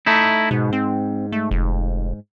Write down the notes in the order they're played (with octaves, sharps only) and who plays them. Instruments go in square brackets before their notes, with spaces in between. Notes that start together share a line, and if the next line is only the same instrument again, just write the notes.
[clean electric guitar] A3 D#4 E4
[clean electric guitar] G#2 [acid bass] B2
[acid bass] C4
A3
F1